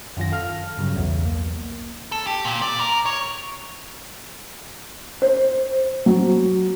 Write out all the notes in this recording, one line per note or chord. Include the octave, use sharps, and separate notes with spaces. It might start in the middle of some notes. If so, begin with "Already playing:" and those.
F#2 D#3 F4 A#6
A4 F5 F6
G2 C#3 F#3 G3
B1 E2
A#3
A4
G4
A#2
D5
A#4
C#5
C5
F#3